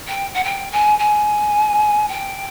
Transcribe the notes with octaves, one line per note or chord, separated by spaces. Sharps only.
G5
F#5
G5
G#5
G#5
G5